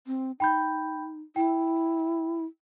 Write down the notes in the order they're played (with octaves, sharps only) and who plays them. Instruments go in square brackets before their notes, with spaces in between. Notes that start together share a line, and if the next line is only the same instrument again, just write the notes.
[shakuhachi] C4
[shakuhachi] D#4 [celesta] G5 B5 G6
[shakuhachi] E4 [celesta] G5